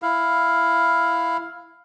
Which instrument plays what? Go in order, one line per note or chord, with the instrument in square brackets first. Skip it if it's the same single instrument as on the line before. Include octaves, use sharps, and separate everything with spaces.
[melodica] E4 F5